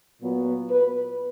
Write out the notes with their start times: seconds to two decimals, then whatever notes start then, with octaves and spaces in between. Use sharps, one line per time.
0.22 A#2 F#3 B3
0.70 B4